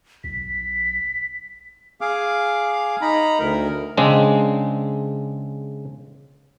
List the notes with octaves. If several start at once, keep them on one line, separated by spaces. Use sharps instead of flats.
B1 B6
G#4 F5 D6
D#4 A#5 B5
D2 A#4
C#3 G#3 C4 D4